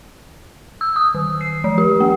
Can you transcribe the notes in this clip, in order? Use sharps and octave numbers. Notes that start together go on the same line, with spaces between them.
E6
D#6
D#3
C7
F3
G4
A#3